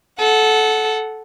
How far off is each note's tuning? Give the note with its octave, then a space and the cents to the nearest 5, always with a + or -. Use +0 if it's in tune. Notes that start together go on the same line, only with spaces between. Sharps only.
A4 -15 F#5 +0